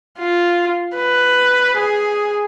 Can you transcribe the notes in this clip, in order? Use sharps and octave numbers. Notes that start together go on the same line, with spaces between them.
F4
B4
G#4